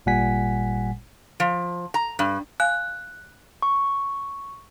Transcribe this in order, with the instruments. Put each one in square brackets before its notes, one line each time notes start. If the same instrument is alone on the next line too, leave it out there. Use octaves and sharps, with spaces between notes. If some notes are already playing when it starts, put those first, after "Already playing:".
[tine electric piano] G#1 A#2 G3 F#5 G#5 B6
[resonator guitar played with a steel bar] F3
A#5
G2
[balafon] F5 G#5 [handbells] F#6
[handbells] C#6